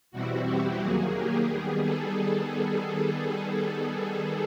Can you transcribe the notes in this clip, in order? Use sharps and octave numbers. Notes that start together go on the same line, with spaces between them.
E2 B2 G3 C4 E4 F#4
G4
D#2 D#3 F#3 A#3 G#4
G4
D#3 G3 B3 G#4
A4